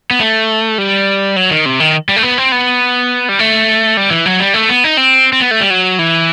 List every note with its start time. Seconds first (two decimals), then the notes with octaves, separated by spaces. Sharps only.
0.11 B3
0.20 A3
0.78 G3
1.36 F#3
1.51 D#3
1.66 C3
1.80 D#3
2.09 G3
2.16 A3
2.23 B3
2.38 C4
2.52 B3
3.29 G3
3.39 A3
3.97 G3
4.11 E3
4.26 F#3
4.40 G3
4.54 A3
4.69 B3
4.84 D#4
4.97 C4
5.33 C4
5.41 B3
5.51 A3
5.61 G3
5.70 F#3
5.99 E3